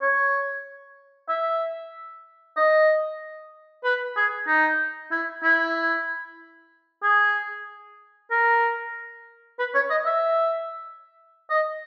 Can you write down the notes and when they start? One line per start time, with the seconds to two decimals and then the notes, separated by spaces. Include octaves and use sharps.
0.01 C#5
1.29 E5
2.57 D#5
3.84 B4
4.16 G#4
4.48 D#4
5.12 E4
5.43 E4
7.03 G#4
8.31 A#4
9.59 B4
9.75 C#5
9.90 D#5
10.06 E5
11.50 D#5